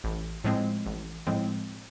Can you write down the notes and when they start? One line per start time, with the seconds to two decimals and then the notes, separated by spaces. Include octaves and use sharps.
0.04 A1
0.44 A2 F3 G#3 C4
0.86 A1
1.27 A2 F3 G#3 C4